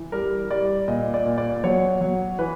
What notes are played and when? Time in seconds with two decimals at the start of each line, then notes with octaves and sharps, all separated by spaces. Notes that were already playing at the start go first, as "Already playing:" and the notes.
Already playing: E3
0.12 G3 A#4
0.50 G3 D5
0.88 A#2 D#5
1.14 D5
1.26 A#2
1.38 D5
1.64 F#3 C#5
2.01 F#3
2.39 E3 B4